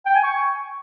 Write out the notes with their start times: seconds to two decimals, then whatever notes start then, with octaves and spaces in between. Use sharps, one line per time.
0.06 G5
0.15 G#5
0.24 C#6